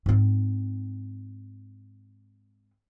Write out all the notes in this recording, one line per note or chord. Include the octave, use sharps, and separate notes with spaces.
G#2 C4